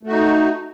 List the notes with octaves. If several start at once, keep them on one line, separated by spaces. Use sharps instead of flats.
A3 D#4 F#4